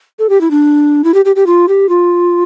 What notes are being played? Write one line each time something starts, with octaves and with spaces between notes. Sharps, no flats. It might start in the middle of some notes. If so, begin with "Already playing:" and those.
A4
G4
E4
D4
E4
G4
G4
G4
F4
G4
F4